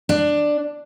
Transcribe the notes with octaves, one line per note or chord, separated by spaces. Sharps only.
D4